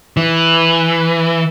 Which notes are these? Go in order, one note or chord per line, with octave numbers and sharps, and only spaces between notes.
E3